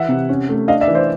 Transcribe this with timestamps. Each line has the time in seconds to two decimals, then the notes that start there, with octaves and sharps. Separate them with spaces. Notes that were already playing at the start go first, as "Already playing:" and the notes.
Already playing: E3 E4 E5 F#5
0.09 C3
0.29 C#4
0.49 A3
0.68 D4 D#5 F5
0.81 D5 E5
0.88 E3
0.95 C5 D5